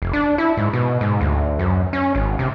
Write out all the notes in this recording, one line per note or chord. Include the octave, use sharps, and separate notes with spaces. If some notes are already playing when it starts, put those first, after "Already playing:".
F1
D4
E4
G#2
B2
G#2
D2
F#2
C#4
G#1
C3